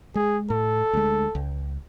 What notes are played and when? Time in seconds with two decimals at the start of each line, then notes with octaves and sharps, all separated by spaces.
0.15 G#3 G#4
0.50 A2 A4
0.93 D2 G#3
1.35 C#2